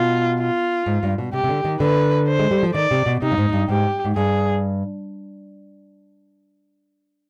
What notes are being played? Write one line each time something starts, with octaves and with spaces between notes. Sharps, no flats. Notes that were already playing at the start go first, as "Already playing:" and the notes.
Already playing: B2 F4
F4
G#2
G2
B2
C3 G4
C3
D3
D#3
D3 B4
C5
G#3
G3
F3
D#3 D5
C3
B2
C3 D#4
G2
G#2
G#2
G2
G#2 G4
G#2
G2 G#4